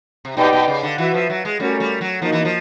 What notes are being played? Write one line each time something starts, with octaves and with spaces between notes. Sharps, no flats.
C3
B2 D#4 G4 B4 D5 G5
B2
C#3
D3
E3 F#4 B4 E5
F3
F#3
G#3
G3 A3 C#4 F#4 A#4 C#5
G3
F#3
F3 A#3 D#4 F#4
E3
F3